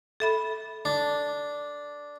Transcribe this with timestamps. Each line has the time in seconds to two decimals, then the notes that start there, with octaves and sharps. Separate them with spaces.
0.20 A4 E5 B5
0.85 D4